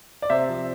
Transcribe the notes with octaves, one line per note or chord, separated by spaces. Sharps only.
D5
C3 C5 E5
F3